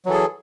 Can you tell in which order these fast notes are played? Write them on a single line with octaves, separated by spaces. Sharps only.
F#3 E3 A4 G#4